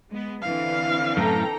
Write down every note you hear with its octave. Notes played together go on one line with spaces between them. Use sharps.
G#3 B3
D3 E3 C4 F5
F#2 A2 A4 G5 A#5